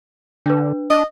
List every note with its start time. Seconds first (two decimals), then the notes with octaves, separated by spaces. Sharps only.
0.46 D3 D4 B4
0.90 D4 D#5